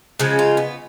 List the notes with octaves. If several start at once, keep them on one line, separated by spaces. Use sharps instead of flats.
C#3 F3 G#3 C#4
F4
B3